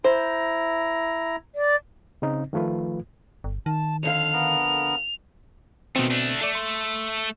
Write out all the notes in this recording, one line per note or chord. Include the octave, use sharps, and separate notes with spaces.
E4 C5 A#5
D5
C#3 C4 D#4
D#3 F3 A3 F4 B4
G1
D#3 A5
F2 D3 F5 F7
B3 A#4
B2 D#3 A3 C4
A3 D4
A3 A4 D5
C6